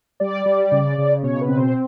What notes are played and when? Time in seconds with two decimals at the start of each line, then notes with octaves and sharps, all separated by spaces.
0.20 G3 D5
0.46 G3
0.72 C#3
0.98 C#3
1.23 B2 C#5
1.41 B4
1.49 C4
1.57 C5